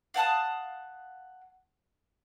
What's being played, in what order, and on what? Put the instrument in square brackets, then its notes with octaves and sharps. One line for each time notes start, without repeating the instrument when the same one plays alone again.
[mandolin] F5 F#5 A5 D#6